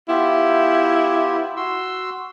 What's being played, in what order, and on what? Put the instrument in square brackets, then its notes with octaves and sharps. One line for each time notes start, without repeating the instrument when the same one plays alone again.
[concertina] B3 F4 G4 [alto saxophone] E4
[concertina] F#4 C6 E6